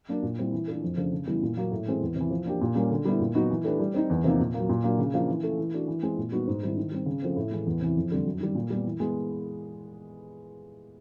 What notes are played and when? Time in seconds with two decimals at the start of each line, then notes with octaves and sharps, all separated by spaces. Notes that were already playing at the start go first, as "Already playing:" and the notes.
0.08 F#3 A#3 D4
0.23 A#2
0.38 G3 C4 E4
0.52 E3
0.67 A3 D4 F4 A4
0.83 F2
0.97 C#3 F3 A3 D4
1.13 C#3
1.27 E3 G3 B3 E4
1.42 A#2
1.57 F#3 A#3
1.72 A2
1.86 E3 G#3 C4
2.01 E2
2.15 C3
2.21 E3
2.31 F3
2.45 A#3 D4 G4
2.61 A#2
2.75 G3 A#3 C#4
2.90 D3
3.05 G3 B3 E4
3.20 A#2
3.35 F#3 B3 D#4 F#4
3.50 E3
3.64 A3 D4 G4 B4
3.79 G3
3.94 C4 D#4
4.09 E2
4.24 C3 F3 A#3 D#4
4.39 A#2
4.54 F#3 A#3
4.69 A#2
4.84 F#3 A#3 D4
4.99 C#3
5.14 F3 A#3 D4 F4
5.28 E3
5.43 A3 C#4
5.58 E3
5.73 A3 D4 F#4
5.88 E3
6.03 G#3 C4
6.18 A#2
6.32 G3 B3 D#4 F#4
6.47 G#2
6.62 D#3 G3 C4 E4
6.77 D#3
6.92 G3 C4
7.06 C#3
7.22 F3 A3 C4
7.36 A2
7.51 E3 G#3
7.66 E2
7.81 C3 E3
7.97 F2
8.11 D3 G3 C4
8.26 F#2
8.40 D#3 G3
8.55 A#2
8.70 G3 B3
8.85 E3
9.00 G#3 B3